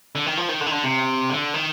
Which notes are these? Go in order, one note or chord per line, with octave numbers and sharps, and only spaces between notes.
D3
D#3
F3
D#3
D3
D#3
D3
C3
D3
D#3